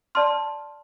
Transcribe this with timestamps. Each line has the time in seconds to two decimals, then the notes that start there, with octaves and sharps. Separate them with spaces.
0.15 D5 A5 C6 F6